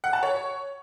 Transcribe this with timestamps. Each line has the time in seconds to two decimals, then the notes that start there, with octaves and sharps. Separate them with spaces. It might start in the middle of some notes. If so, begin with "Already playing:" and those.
0.04 F#5
0.13 A5
0.23 C#5